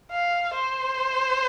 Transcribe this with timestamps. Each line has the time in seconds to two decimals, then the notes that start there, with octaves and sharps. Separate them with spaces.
0.11 F5
0.54 C5